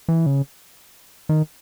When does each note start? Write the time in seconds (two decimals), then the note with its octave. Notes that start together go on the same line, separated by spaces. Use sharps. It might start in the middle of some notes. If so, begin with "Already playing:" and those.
0.08 E3
0.26 C#3
1.29 D#3